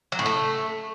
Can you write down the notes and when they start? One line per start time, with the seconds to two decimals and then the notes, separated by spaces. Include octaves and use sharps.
0.12 F#3
0.19 A2
0.26 A3